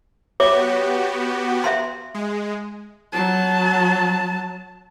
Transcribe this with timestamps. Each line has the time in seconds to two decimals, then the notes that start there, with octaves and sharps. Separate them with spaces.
0.40 B3 F#4 G4 C#5 E5 D6
1.64 E5 F5 C6
2.14 G#3
3.13 F#3 A5